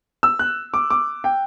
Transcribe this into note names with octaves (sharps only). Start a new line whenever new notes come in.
E6
F#6
D6
D6
G5